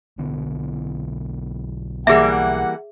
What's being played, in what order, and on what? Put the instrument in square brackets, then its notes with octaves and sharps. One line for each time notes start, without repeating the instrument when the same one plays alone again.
[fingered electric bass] B1 D3 B3
[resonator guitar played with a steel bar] E3 G3 A#3 [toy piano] G#4 E5 [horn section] F#5